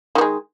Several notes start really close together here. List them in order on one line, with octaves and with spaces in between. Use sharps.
D#3 B3 G#3